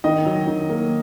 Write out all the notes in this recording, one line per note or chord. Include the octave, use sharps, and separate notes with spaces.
D#3 D#5
F#3
D#3
A#3